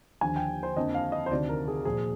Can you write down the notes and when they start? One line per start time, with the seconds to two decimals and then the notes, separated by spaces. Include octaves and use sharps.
0.21 D#2 D3 F3 G#5
0.36 G5
0.63 C5
0.76 F2 D3 F3 A#3 D#5
0.94 F5
1.12 D#5
1.26 C5
1.31 D2 C3 D#3 D5
1.49 A#4
1.68 G#4
1.85 A#2 F3 A#3 G#4